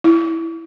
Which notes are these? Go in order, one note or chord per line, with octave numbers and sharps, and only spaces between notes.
E4